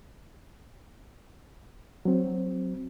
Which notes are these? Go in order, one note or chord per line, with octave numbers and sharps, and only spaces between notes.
F#3 C4